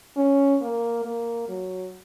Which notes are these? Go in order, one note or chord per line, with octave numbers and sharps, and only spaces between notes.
C#4
A#3
A#3
F#3